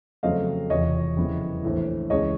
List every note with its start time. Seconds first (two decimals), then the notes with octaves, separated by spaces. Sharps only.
0.23 F2 C#3 F#3 A3 C4 D#5 F5
0.70 E1 E2 C3 F3 C#5 D#5
1.16 F2 C#3 E3 G3 B3
1.63 A#1 A2 E3
2.10 C#2 C#3 E3 G#3 C#5 D#5